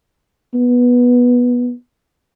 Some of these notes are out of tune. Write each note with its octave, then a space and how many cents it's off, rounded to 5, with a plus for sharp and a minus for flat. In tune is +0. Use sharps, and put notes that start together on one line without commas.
B3 -10